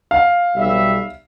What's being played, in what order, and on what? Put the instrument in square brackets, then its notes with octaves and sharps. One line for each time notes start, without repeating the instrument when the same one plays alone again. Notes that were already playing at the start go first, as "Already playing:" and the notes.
[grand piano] F5
[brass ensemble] B1 G3 E5